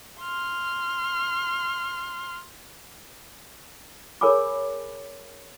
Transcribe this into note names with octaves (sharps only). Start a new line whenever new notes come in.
C6 F6
G#4 A#4 C#5 G#5 B5 D6